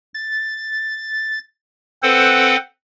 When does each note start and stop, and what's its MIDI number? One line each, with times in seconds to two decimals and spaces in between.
0.14 1.39 93
2.03 2.56 60
2.03 2.56 69
2.03 2.56 71
2.03 2.56 72
2.03 2.56 78